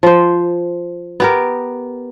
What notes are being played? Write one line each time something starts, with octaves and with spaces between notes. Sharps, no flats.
F3 C5
B3 G4 A#4